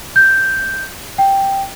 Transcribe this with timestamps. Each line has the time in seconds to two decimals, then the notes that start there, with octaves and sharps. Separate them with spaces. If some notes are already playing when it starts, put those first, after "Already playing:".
0.16 G6
1.18 G5